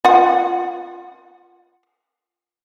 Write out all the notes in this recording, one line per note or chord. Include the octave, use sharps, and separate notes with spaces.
F4 F#5